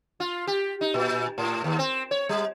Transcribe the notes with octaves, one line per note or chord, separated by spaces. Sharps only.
F4
G4
D#4
A#2
A2
D#2
C4
C#5
G3